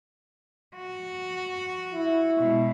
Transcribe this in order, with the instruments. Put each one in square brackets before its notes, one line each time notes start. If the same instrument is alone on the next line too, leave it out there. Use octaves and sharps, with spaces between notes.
[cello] F#4
[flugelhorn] E4
[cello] B2 G#3